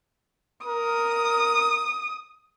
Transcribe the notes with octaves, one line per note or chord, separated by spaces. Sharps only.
A#4 D#6